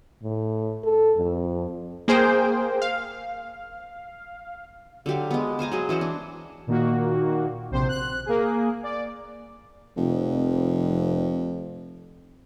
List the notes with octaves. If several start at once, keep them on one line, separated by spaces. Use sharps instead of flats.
A2
A4
F2
A#3 G#4 C5 G5
F5
D3 F#3 G4 F5
G#3 B3
C5 F5 G#5 A#5
F#3 G#4 D#5
E3 C#4 F#4 C5
D4
A#2 D#3 A#3 F#4
A#1 C3 C5
F#6
A#3 G#4
D5
F1 F2